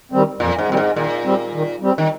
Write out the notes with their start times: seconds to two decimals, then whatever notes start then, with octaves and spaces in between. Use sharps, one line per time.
0.12 D#3 G3 C4
0.40 F2 A#2
0.58 G#2
0.68 A#2 D#3 G3 C4
0.77 G#2
0.96 A#2 D#3
1.24 G3 C4
1.53 D#3
1.81 G3 C4
1.98 D#3